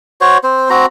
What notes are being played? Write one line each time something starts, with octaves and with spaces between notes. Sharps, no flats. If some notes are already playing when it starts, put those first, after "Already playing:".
F#4 C5 C#5
C4 C5
C4 F#4 A#5